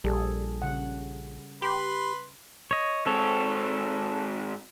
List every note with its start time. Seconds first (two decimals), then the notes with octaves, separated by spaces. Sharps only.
0.04 A#1 G3 G#4 A4
0.62 C#3 F#5
1.62 G4 B4 B5 C6
2.71 C#5 D#5
3.06 G#2 C4 A4 C#5